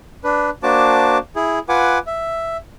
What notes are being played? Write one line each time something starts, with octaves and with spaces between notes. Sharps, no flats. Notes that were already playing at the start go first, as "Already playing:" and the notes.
D4 B4
A#3 D4 F#4 C5 A5 D6
E4 G#4
F4 B4 F#5 G#5 D6
E5